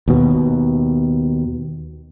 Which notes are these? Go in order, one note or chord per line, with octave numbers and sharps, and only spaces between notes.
D#2 B2